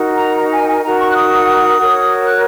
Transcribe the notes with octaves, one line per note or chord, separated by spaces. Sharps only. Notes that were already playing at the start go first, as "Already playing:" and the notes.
Already playing: D#4 F#4 A#4
A#5
A#5
G#5
G#5
D#4 F#4 A#4 A#5
C#6
F#6
D#6
F#4 A#4 C#5
F#6